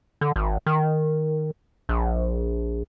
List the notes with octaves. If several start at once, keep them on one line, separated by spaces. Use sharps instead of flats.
D3
G#1
D#3
A#1